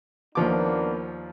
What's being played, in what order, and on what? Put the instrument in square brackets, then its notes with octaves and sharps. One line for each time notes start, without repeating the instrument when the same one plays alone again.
[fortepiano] D#2 F3 D6 [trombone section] A#3 B3 D4